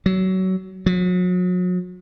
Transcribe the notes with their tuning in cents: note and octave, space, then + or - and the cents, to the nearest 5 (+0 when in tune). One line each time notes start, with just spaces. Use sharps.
F#3 +25
F#3 -40